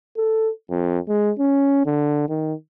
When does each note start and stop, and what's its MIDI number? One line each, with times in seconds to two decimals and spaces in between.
0.17 0.50 69
0.70 0.98 41
1.08 1.31 56
1.39 1.82 61
1.86 2.25 50
2.29 2.54 51